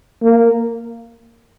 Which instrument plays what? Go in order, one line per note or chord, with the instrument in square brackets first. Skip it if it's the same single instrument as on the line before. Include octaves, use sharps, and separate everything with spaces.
[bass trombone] A#3